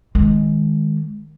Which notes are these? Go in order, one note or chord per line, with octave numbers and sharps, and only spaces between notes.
D#3 G#3